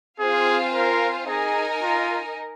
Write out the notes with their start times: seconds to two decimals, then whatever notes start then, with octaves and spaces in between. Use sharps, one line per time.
0.20 C4 F4 G#4 C5 F5 G#5
0.74 A#4
1.28 D#4 G#4 A#4 D#5 G#5
1.83 F4